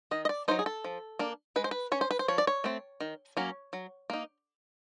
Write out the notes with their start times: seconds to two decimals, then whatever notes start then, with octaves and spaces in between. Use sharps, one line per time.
0.11 D#3 D#5
0.25 D#5
0.29 D5
0.48 F#3 A#3 D#4 C5
0.59 G#4
0.66 A4
0.84 F3
1.19 A#3 D4
1.56 G#3 B4
1.64 C5
1.71 B4
1.92 C#4 C#5
2.01 C5
2.11 B4
2.19 C5
2.28 F3 C#5
2.38 D5
2.47 C#5
2.64 A3 C4
3.00 D#3
3.37 F#3 A#3 C#4
3.73 F#3
4.10 A#3 D#4